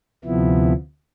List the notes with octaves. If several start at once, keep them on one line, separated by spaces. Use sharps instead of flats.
D2 C3 F3 B3 E4